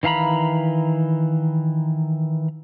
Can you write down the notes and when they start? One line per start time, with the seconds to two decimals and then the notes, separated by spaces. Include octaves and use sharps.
0.03 D#3 E3 F5 A#5 B5